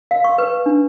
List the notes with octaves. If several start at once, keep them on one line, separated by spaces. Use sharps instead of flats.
F5
C#6
B4
D4